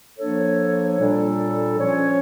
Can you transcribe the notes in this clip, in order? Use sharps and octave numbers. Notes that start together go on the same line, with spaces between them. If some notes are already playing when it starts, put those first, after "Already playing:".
F3 A#3 D4 A4 C#5
A#2 G3 D4 A4
F3 C#4 F4 C#5